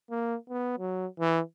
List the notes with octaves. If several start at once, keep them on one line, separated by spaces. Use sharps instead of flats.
A#3
B3
F#3
E3